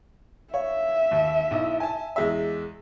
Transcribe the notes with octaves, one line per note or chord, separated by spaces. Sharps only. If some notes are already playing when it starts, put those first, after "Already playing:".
C#5 E5 F5
D#2
B1 D#4 E4
G#5 A5
E2 G#3 E5